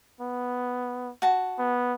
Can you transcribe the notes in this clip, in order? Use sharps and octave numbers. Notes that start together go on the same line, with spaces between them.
B3
F#4 A5
B3